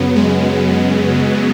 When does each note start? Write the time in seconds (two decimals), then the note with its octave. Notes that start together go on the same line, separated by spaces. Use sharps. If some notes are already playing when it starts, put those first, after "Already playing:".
Already playing: F#2 C#3 F#3 B3
0.16 G#3